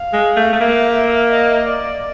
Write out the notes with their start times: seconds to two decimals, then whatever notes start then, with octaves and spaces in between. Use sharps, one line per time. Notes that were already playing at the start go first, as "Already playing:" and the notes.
Already playing: F5
0.13 G#3
0.36 A3
0.53 A3
0.60 A#3 E5
1.32 D#5
1.67 D5